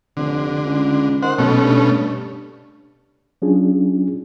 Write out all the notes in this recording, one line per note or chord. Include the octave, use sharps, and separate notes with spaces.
F1 D3
C#2
D#3 C5 F#5
B1 B2 A3 C#4
G2
F#3 C#4 D4 F4 G#4